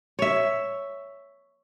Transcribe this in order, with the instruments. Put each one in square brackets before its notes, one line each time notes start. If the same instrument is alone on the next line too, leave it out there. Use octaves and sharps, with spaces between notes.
[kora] C#5 E5